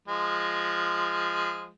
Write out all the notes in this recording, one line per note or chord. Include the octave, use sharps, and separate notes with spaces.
F3 G#3